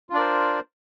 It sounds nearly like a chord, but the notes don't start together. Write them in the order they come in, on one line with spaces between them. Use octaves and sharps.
F4 D4 D5 A#4 C5